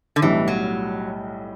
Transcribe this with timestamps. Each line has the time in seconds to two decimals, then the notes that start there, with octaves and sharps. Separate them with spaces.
0.16 D3
0.22 B1 A2 E3 G3
0.48 F#3